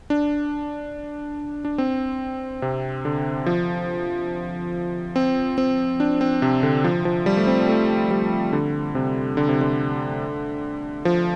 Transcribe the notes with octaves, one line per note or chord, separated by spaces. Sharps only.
D4
D4
C4
C3
D3
F3
C4
C4
D4
C4
C3
D3
F3
F3
G3
A3
C4
A3
G3
D3
C3
D3
C3
D3
F3